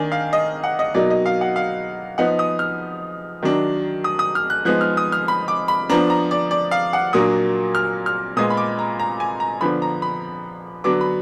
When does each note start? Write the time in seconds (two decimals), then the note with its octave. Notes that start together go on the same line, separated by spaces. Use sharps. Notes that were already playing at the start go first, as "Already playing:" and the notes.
Already playing: D#3 A#3 D4 G#5
0.12 F5
0.33 D#5
0.64 F#5
0.79 D#5
0.94 B2 F#3 A#3 D#4 D5
1.10 D#5
1.26 F5
1.41 F#5
1.56 F5
2.18 F3 B3 D#4 F#5
2.39 D#6
2.59 F6
3.43 D#3 F#3 D4
4.04 D#6
4.19 D#6
4.35 F6
4.50 F#6
4.65 F3 G#3 B3 D#4 F#6
4.81 F6
4.97 D#6
5.12 F6
5.28 B5
5.48 D6
5.68 B5
5.90 F3 B3 D4 A#5
6.10 A#5
6.31 D5
6.51 D5
6.71 F5
6.93 F#5
7.13 A#2 F#3 A#3 D4 D#6
7.75 F6
8.06 F6
8.36 A#2 G#3 B3 D#6
8.50 B5
8.57 D6
8.79 A#5
9.00 A#5
9.20 G#5
9.40 A#5
9.61 D3 F3 B3 D4 B5
9.82 A#5
10.02 B5
10.84 D3 F#3 B3 D4 D6
11.01 B5